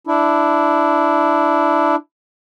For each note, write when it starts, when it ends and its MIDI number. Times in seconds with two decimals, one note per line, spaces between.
0.07 1.96 62
0.07 1.96 64